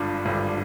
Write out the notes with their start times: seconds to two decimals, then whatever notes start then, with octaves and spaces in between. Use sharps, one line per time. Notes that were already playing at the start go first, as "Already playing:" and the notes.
Already playing: G#1 G2 D3 D4 F4
0.25 G#1 G2 D3